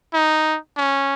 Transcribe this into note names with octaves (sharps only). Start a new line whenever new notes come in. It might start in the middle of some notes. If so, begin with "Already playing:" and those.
D#4
C#4